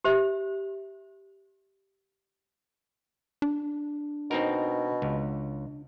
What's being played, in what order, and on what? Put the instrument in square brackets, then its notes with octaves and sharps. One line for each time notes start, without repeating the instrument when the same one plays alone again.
[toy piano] G4 C5 E5
[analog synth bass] D4
[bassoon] B2 [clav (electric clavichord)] C4 D#4 A#4
[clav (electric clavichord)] C#2